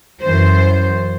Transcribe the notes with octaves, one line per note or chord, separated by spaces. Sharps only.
F#2 E3 C5